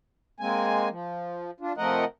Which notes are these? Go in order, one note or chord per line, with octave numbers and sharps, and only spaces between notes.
G#3 A#3 C4 G#5
F3
D4 F4
C3 F3 A3 A#4 D#5 F#5